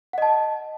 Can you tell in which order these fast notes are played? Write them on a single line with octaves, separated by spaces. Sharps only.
F#5 D#5 A5